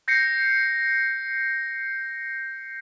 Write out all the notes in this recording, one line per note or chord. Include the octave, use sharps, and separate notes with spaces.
G6 A#6 C7 C#7